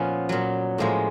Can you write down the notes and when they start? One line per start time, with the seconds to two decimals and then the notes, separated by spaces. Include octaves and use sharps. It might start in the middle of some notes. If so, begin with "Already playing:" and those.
Already playing: A#2 F3 B3 C#4
0.29 A#2 F#3
0.78 A2 F3 G#3 A#3